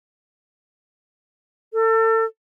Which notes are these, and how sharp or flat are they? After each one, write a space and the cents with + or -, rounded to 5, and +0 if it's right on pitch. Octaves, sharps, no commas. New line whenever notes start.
A4 +35